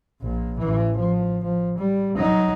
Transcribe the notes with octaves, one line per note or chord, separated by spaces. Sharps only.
A#1 A#2
A1 E3
F3
F3
G3
F#3 D#4